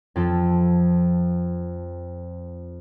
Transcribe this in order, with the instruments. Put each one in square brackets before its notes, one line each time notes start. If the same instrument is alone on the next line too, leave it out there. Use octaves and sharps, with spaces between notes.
[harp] F2 F3 F4 A4